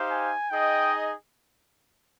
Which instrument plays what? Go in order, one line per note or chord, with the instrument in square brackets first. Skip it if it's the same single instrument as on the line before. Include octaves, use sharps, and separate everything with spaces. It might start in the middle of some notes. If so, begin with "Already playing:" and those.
Already playing: [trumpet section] D#4 G4 C5 F5
[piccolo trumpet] G#5
[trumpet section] D#4 G#4 D#5 [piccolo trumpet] G5